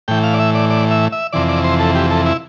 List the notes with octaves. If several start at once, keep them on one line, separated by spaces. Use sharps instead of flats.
A2 E3 G5
F5
D5
E5
D5
D5
E5
E5
F2 C3 E3 D5
D5
C5
A4
G4
A4
E4